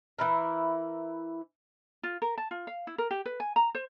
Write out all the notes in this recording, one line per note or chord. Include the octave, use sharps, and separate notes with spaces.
E3 E4 A#4
F4
A#4
A5
F4
F5
E4
A#4
G4
B4
G#5
A#5
C5